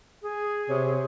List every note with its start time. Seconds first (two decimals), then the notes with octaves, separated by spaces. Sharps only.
0.22 G#4
0.69 C3 C#5